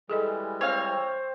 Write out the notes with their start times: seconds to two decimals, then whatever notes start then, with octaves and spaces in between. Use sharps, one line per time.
0.10 E3 G3 G#3 G#4 A4 D#5
0.61 C4 C#5 F5